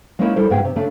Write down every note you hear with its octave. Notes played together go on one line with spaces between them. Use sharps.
G#3 A#3 C#4 D#4 E4 A#4
G3 E4 A4 A#4 C5
G#2 C#3 B3 G#4 G5
C3
C#3 A3 D4